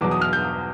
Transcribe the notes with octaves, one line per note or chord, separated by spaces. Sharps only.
E2 B2 F#3 D6
D#6
F6
G6